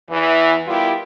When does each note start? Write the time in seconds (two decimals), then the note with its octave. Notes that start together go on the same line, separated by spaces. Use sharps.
0.10 E2 E3 E4
0.67 G3 B3 E4 F4 G4 A#4